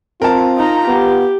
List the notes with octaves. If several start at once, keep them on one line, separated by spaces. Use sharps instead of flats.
C4 F4 A#4 A5
D#4 A#5
B3 G4